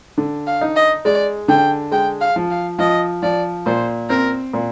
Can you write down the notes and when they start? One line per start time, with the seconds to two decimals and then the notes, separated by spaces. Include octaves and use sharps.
0.18 D3
0.47 F5
0.61 D#4
0.76 D#5
1.05 G#3 D5
1.48 D3 G5
1.92 G#3 G5
2.21 F5
2.36 F3
2.51 F5
2.79 F3 D#5
3.22 F3 D5
3.66 A#2 C5
4.10 C4 A#4
4.53 A#2